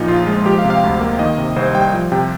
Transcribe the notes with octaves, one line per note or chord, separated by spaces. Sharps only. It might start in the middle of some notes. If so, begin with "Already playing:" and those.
Already playing: A#2 F3 D#4
A#1 F4
G#3
F3 G4
F5
C3
F5
D2
A#3
D#3 D#5
C3
C2 C5
G3 G5
F3
C3 G5